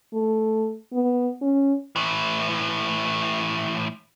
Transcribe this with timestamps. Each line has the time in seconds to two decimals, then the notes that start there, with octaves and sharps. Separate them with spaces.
0.13 A3
0.93 B3
1.42 C#4
1.96 A2 E3